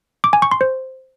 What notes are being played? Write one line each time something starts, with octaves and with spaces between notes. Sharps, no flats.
D6
G#5
C#6
C6
C5